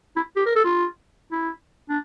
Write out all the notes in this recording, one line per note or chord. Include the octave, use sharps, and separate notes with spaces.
E4
G4
A#4
A4
F4
E4
D4